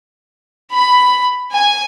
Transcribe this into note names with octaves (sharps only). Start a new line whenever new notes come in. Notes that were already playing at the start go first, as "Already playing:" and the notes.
B5
G#5